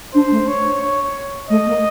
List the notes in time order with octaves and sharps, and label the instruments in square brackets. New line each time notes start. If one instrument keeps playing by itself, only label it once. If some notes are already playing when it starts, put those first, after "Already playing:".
[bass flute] D4 [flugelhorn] C5
[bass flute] A3
[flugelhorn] C#5
C#5
[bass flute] A3 [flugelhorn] D#5
[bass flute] A#3